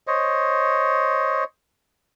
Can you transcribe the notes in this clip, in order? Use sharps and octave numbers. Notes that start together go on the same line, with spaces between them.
C5 C#5 D#5